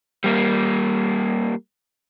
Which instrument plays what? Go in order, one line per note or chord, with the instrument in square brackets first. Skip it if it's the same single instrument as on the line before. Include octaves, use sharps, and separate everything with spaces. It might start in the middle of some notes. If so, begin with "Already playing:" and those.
[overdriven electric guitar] G3 A#3